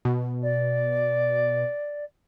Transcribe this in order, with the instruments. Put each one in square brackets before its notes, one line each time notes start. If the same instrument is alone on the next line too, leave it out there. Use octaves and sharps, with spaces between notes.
[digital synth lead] B2
[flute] D5